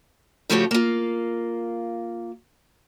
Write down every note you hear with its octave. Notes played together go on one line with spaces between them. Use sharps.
C#3 F3 A3 F#4 G4 C#5
A#3 F4